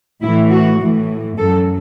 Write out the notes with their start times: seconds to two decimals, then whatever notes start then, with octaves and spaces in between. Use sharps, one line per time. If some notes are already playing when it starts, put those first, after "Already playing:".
0.21 A2 E3 E4
0.51 F#4
0.79 A2 E3
1.37 F#2 F#3 A4